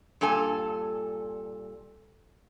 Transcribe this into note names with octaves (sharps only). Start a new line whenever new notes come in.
G2 A#2 A4 G#5